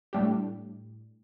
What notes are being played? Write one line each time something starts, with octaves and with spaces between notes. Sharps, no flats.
A2 G3 D4 G4